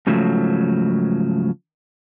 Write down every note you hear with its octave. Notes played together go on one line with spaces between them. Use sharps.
G#2 C#3 F3 F#3 A3